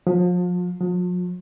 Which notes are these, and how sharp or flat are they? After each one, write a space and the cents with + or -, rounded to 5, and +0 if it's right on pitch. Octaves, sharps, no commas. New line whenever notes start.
F3 +35
F3 +45